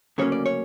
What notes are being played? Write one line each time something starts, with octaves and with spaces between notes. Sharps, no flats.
D2 C#3 F#3 A#3 C#4 C#5
D5
C#5